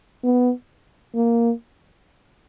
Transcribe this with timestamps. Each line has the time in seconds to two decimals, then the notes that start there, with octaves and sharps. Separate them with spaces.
0.24 B3
1.15 A#3